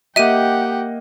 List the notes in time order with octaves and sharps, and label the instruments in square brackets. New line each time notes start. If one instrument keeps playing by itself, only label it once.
[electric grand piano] A#3 D#5 [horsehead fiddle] G4 [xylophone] E5 D#7 [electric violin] F#5 G5